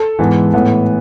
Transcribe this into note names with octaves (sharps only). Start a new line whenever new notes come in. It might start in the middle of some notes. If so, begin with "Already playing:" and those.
Already playing: A4
G#2 E3 G#3 B3
A2 E3 B3